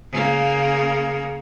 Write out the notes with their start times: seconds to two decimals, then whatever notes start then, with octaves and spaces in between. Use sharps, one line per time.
0.11 C#3 A#3